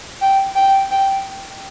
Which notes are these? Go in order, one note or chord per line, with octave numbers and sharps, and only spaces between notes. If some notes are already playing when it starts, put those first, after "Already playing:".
G5
G5
G5